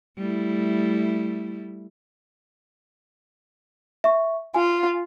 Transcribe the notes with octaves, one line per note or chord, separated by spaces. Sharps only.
G3 A3 E4
E5 C#6
F4 G#5